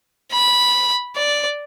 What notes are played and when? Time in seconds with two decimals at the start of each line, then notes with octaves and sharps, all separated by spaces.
0.32 B5
1.16 D5